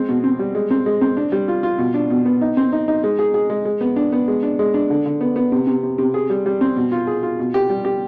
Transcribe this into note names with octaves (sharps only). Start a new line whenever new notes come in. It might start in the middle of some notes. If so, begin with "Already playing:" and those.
Already playing: G#3 C4
B2
C4
G3
G#3
C4
G#3
C4
D4
G3
F4
F4
B2
D4
B2
B3
D#4
C4
D#4
D#4
G#3
G#4
G#4
G#3
G#3
B3
D4
B3
G#3
D4
G#3
D4
D3
D3
B3
B3
C3
C3
C3
C3
G#4
G3
G3
C4
B2
F4
G#4
F4
B2
G4
G3
G4